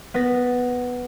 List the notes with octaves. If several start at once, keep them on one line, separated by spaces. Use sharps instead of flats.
B3 B4 A6 A#6